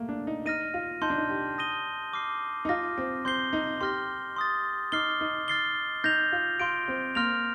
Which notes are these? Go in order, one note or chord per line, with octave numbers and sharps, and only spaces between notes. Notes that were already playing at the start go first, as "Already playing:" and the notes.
Already playing: A3 A#3
D4
D#4
D#4 F6 A#6 D#7
F4
D#4 A5 C6 G6
D4
D#4
G4
D#6 A#6 D#7 G7
D6 F6 C7
D#4
F4 D6 F6 A#6
C4
C4 C6 G6 C7 G7
D#4
G4 C6 F6 A#6
C6 D#6 A6
D#4 D6 F6 C7 G7
D#4
F6 A6 C7 G7
D#4 G6 A#6 F7
F4
F4 C6 G6 D7
C4
A#3 C6 F6 A#6 F7